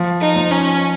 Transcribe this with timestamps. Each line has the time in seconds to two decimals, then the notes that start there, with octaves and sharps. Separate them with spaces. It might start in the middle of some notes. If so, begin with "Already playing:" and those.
Already playing: F3
0.21 D#4
0.36 F3
0.51 C#4